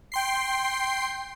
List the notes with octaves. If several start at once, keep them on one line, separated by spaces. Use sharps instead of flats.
G5 C6 C7